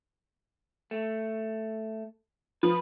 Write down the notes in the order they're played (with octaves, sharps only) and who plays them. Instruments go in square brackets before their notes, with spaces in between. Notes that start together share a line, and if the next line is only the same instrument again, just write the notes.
[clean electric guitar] A3
[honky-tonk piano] F3 [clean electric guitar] B4